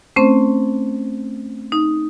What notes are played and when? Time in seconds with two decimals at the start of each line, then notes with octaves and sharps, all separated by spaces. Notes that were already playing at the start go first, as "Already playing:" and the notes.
0.16 A3 C4 C#4 C5
1.72 D#4